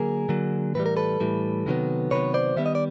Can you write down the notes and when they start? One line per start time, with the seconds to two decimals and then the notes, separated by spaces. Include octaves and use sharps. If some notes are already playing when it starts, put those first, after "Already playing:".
Already playing: D3 F#3 A#3 G#4 A#4
0.29 D3 F#3 A#3
0.75 A2 E3 G3 B4
0.86 A#4
0.97 A4 B4
1.20 A2 E3 G3
1.66 C3 D#3 F#3 B3
2.11 C3 D#3 F#3 B3 B4 C#5
2.34 C5 D5
2.57 D#3 G3 B3 E5
2.66 D#5
2.75 D5